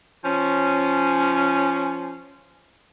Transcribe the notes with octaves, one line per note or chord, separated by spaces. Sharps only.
F3 C#4